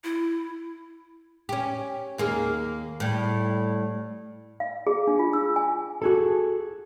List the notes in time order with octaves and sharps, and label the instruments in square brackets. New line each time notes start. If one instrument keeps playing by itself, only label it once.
[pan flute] E4
[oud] C#4 G4
D#2 A#3 G#4
A2 G3
[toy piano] F5
G#4
D4
F4
E6
G#5
[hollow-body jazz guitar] F#4 G#4 A4